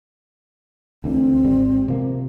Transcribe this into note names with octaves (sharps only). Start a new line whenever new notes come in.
D2 D3 E3 C4
G#1 G3
C3 F3 A#3